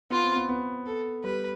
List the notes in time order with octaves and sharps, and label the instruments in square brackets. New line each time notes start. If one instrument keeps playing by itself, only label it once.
[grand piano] B3 [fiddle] F4
[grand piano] C4
B3
B3
[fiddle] A4
[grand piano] G3 [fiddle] B4